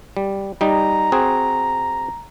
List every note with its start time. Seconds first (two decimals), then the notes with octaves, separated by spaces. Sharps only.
0.17 G3
0.61 G3 D#4 A#5
1.12 C4 F#4 G#4